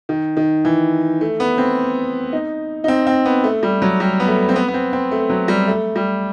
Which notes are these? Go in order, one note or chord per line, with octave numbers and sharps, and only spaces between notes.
D#3
D#3
E3
A3
B3
C4
D#4
D#4
C4
C4
B3
A3
G3
F#3
G3
B3
A3
C4
B3
B3
C4
C4
A3
F#3
G3
A3
G3